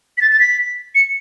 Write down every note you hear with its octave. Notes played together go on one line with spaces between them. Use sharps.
B6
A6
A6
B6
C#7